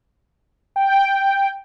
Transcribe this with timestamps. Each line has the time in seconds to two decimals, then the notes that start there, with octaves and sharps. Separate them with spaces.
0.76 G5